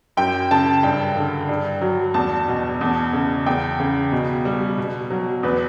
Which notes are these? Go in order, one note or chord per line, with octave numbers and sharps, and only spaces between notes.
F#2 G5
C#3 A5
G2 G5
D3
G2
F#3
E2 A5
B2
E2
C#3
E2 G5
C#3
B2
G3
B2
F#3
E2 B4